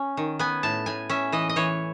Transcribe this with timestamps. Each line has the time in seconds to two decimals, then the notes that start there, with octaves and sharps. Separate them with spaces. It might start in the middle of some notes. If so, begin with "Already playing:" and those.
Already playing: C#4
0.17 D#3
0.39 B3 G#5
0.63 A2 A5
0.86 A2 G#5
1.09 C#4 E5
1.32 E3 D#5
1.49 D#5
1.56 E3 C#5